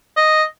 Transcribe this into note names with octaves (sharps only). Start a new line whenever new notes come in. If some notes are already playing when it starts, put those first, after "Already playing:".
D#5